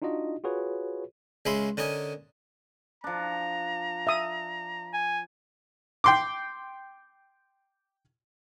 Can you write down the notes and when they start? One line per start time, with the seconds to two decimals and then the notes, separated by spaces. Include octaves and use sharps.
0.02 D4 D#4 F4 F#4 D#5
0.44 F4 F#4 G#4 B4 C#5
1.46 C#2 G#3 C#4 E5 B5 C6
1.77 D3 C#4 A#4 D#5 G#5
3.04 F3 D4 A#5
4.07 E5 D#6
4.94 G#5
6.04 G5 C6 D6